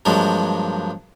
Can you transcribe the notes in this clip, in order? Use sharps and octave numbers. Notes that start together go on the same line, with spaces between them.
G2 F3 F#3 G#3 A#3